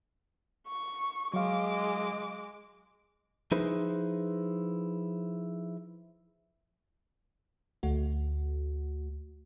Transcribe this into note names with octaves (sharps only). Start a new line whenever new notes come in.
C#6
F#3 G#3 F5 D6
F3 D#4 E4 G#4 B4 C5
D2 A3 F#4